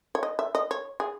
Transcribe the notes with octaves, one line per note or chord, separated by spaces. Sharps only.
C#5
D#5
E5
D#5
C#5
G#4